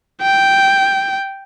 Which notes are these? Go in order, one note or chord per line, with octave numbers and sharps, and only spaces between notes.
G5